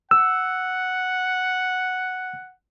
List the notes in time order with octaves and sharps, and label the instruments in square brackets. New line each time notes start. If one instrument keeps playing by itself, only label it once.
[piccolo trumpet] F#5 [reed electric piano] E6